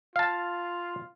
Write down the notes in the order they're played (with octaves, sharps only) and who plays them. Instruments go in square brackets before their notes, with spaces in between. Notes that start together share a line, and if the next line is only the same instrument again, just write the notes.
[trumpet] F4 [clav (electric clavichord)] F5 A5